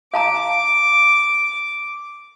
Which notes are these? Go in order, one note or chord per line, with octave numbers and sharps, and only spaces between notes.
F5 A5 A#5 D6